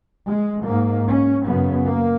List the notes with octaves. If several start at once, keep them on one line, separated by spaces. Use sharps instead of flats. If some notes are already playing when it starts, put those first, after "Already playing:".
G#3
G#2 A#3
C#4
F#2 C#3 B3
A#3